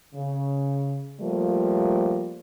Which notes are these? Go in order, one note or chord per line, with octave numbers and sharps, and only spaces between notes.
C#3
F3 G3 A3 A#3